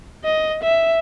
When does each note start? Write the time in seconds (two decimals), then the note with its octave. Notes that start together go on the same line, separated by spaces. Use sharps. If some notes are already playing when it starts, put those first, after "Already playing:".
0.25 D#5
0.63 E5